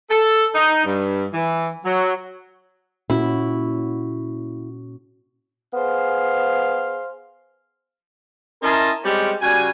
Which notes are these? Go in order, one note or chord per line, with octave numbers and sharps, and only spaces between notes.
A4
D#4
G2
E3
F#3
A#2 C#4 E4 F#4
B3 G#4 C5 F5
C#4 E4 A#4 D#5 A5 C6
G3 G#3 C4 C#4 G4
C#3 G3 F#4 G#5